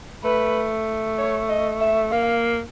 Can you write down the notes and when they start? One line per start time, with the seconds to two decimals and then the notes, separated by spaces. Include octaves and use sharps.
0.24 A3 B4
1.18 C#5
1.49 D#5
1.80 E5
2.12 A#3 F5